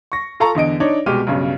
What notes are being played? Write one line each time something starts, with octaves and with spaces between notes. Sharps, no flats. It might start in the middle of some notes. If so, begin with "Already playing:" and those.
C#6 A#6
F4 A4 F5 A5 A#5 C#6
E2 D3 D#5 D7
D4 D#4 C#5
C2 B2 G#3 G4 F6 D#7
B1 G2 C#3